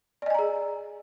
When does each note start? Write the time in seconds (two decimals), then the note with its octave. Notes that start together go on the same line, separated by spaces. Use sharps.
0.22 D5
0.26 D#5
0.30 G#5
0.34 A#5
0.39 G#4